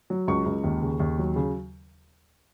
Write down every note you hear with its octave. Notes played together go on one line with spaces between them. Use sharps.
F#3
C#2 C#6
C#2
D#2
C#3
D#2
F#3
C#3